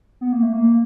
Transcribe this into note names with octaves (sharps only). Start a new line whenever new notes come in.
B3
A#3
A3
A#3